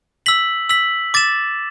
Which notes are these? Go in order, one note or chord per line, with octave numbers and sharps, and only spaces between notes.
E6 B6 F#7
E6 B6 F#7
D6 A6 E7